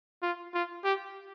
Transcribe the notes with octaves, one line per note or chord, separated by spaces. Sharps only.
F4
F4
G4